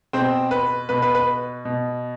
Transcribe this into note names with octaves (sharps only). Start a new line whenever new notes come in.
B2 C4 C5
B4
B2 B4
B4
B4
B2